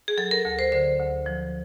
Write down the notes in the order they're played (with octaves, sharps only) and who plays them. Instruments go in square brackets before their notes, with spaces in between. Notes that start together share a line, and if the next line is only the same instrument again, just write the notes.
[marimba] G#4
F#3 A4
A#4
D2
C5
D3 C5
D2
F3